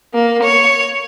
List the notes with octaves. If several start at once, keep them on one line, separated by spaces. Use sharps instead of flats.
A#3
C#5